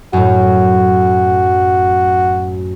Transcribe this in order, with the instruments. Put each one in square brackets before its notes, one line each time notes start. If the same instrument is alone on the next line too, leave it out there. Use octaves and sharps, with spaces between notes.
[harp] F#2 A2 [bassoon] F#4